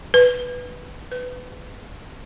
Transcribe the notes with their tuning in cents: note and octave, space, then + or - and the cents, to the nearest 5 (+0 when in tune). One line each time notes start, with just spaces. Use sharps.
B4 -5
B4 +20